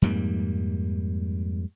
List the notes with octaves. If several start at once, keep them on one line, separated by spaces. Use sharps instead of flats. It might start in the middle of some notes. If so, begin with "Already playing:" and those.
F2 G#2 G3 A#3